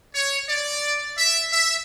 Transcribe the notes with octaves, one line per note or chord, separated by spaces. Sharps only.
C#5
D5
E5
E5